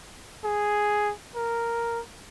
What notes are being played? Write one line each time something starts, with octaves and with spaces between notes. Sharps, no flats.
G#4
A#4